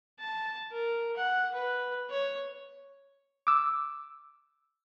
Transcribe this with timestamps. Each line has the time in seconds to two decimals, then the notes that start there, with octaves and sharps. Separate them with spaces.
0.19 A5
0.71 A#4
1.16 F#5
1.54 B4
2.10 C#5
3.47 D6 E6